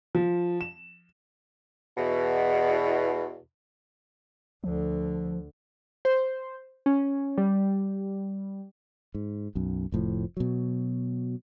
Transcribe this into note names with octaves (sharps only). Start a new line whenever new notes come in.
F3
E7
E2 B2
D2 D3 F3
C5
C#4
G3
G#2
B1 F#2
F1 A2 F3
B2 F#3